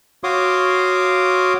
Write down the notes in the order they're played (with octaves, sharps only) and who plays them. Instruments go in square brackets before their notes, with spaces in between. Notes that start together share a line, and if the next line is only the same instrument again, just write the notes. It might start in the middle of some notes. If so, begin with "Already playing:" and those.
[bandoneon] F#4 C#5 F5 C6 D6 D#6